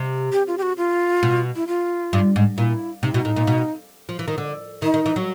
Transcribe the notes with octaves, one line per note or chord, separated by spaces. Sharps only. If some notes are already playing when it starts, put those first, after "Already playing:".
Already playing: C3
G4
F4
G4
F#4
F4
B2
E4
F4
G2
G#2
A#2 E4
C3 D#4
B2 E4
A2 D#4
A#2
B2
F3
E3
D#3
D3
D#3 D#4
D#3
E3
F#3